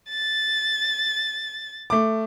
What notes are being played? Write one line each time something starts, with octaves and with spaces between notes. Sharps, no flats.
A6
A3 D6